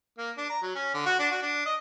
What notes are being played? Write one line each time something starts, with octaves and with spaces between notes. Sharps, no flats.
A#3
D4
A#5
F#3
C#4
D3
F#4
D4
F#4
D4
D#5